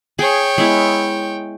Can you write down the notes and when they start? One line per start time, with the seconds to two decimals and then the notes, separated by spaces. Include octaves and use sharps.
0.19 G#4 C#5 G5
0.58 G#3 B3 E4